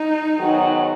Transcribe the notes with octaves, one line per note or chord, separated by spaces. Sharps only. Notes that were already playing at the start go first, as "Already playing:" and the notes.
Already playing: D#4
G#2 D#3 F#3 B3